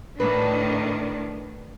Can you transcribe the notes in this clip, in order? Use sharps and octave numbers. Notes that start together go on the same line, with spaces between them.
A2 D#3 D4 B4